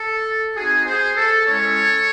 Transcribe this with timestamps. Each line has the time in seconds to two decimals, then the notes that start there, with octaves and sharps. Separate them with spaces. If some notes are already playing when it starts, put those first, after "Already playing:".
Already playing: A4
0.56 C4 D#4 F#4 G#4
0.86 G#4 C5
1.17 A4
1.47 G#3 C#4 E4 A4 C#5